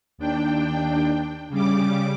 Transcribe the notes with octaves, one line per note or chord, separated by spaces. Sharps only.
D#2 D4 G5
C#3 G3 D6